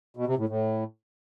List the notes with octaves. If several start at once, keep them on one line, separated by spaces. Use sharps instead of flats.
B2
C3
A2
A2